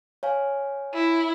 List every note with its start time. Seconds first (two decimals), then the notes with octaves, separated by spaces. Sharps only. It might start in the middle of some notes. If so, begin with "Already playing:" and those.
0.23 C#5 F5 G#5
0.93 E4